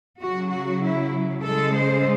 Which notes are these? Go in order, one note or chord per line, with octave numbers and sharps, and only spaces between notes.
C#3 F#3 F#4
F#4
E4
C#3 G#3 A4
C5